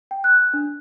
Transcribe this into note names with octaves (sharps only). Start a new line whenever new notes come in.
G5
F#6
D4